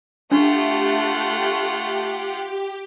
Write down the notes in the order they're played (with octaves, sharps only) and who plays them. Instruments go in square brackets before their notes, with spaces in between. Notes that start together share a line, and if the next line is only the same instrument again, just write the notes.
[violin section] A3 [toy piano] D4 [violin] F4 F#5 [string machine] G4